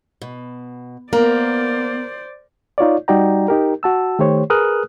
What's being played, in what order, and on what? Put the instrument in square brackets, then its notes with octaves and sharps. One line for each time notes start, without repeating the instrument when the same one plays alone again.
[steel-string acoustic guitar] B2
[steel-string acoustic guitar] A#3 [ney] B3 [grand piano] A#4 [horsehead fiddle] C5 D5
[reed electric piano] D#4 F4 C#5 D5
G3 D#4 F#4 D5 G5 A#5
D#4 G4 A#4
F#4 A5 E6
D#3 A3 G4 C5 C#5
G#4 A#4 B4 D#6 F6 F#6